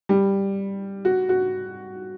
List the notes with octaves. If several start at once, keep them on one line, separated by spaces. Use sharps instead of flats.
G3
F#4
F#4